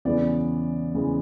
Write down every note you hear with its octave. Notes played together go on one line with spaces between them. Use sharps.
E2 C#3 E3 G#3 B3 D5
E2 C#3 E3 G#3 B3